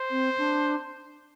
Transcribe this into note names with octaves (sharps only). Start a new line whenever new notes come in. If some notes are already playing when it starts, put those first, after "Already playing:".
Already playing: C5
C4
D4